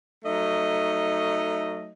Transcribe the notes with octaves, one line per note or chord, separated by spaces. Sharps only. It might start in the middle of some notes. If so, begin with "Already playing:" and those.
F#3 A3 D#4 D#5